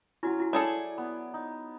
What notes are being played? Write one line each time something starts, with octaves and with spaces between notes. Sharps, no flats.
F#3 C#4 E4 F#4
E4 F#4
E4 G#4 A4 C#5 D5
B3
D#4